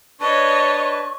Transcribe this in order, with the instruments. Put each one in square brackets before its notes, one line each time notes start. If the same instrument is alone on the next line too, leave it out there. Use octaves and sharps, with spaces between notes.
[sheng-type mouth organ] D4 B4 A5 [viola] C#5 D#5 [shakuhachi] C#6